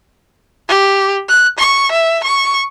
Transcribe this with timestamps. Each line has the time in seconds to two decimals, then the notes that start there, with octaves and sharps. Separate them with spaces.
0.68 G4
1.29 F#6
1.58 C#6
1.91 E5
2.24 C#6